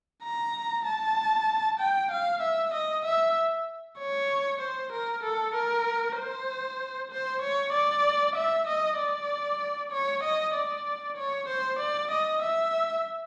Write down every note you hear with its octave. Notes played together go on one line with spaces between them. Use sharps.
A#5
A5
G5
F5
E5
D#5
E5
C#5
C5
A#4
A4
A#4
C5
C5
C#5
D5
E5
D#5
D5
C#5
D#5
D5
C#5
C5
D5
D#5
E5